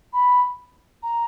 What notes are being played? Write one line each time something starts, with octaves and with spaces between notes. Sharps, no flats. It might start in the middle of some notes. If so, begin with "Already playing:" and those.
B5
A#5